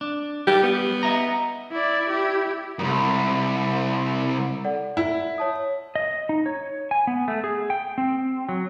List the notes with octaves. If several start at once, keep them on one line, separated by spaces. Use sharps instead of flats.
D4
G3 G4
B3
D#5 E5 A#5
E4 D5
E4 G4
C2 F#2
A4 D5 F#5
E4
C#5 A5 D#6
D#5
D#4
C#5
G#5
B3
A3
G#4
G5
C4
F#3